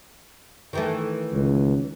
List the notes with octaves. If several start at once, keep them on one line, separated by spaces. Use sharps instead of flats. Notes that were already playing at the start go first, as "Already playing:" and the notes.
D#3 E3 A3
C#2